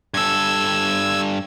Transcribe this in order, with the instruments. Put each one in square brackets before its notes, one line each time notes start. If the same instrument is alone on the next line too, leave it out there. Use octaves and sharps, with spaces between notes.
[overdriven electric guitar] G2 A4 [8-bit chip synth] E6 G#6